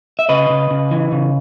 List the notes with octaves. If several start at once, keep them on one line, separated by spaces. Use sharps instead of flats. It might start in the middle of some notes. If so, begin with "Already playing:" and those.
E5
C#3 B4 D#5
C#3
C#3
E3
C#3